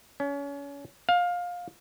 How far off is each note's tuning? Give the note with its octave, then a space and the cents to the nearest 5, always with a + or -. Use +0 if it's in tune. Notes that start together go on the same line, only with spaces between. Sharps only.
C#4 +30
F5 +20